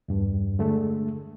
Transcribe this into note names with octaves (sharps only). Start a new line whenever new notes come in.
E2 G2
D3 G#3 A3